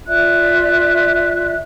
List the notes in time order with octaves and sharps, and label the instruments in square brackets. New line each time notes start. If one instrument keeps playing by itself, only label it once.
[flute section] F4 D5 E5 F#6